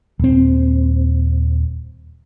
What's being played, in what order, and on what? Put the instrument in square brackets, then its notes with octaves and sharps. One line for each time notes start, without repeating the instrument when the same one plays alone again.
[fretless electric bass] D#1 C4